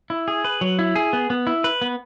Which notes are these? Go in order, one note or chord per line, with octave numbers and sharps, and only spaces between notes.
E4
G#4
B4
F#3
E4
G#4
B3
B3
E4
B4
B3